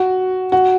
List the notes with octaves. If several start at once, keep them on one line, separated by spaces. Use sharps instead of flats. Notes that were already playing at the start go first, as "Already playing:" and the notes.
Already playing: F#4
F#4